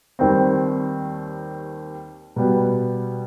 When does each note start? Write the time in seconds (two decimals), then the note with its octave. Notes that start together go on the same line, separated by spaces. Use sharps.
0.19 D#2 D#3 G3 C4
2.36 B2 G3 B3